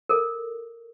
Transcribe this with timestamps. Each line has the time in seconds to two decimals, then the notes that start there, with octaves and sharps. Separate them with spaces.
0.09 A4 A#4